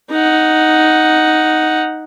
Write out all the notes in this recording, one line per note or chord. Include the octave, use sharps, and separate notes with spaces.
D#4 F#5